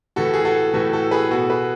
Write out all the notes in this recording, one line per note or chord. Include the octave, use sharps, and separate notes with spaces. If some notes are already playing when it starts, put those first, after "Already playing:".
A2 E3 F#4 A4
G#4
F#4 A4
A2 E3 F#4 A4
F#4 A4
G#4 B4
B2 F#4 A4
G#4 B4